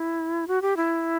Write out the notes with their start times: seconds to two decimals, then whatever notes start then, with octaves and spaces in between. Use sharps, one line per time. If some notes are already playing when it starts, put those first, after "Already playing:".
Already playing: E4
0.48 F#4
0.62 G4
0.77 E4